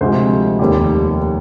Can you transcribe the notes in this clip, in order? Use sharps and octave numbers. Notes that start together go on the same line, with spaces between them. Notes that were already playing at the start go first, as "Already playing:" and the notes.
D2 C3 F3 G#3 C5
F1 D#2 D#3 G4